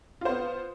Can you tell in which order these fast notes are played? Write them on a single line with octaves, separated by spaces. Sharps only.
F4 C5 B3